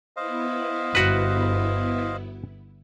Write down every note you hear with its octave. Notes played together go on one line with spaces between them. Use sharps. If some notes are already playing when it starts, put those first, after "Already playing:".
B3 E4 C5 D#5 F5
G1 F#4 B4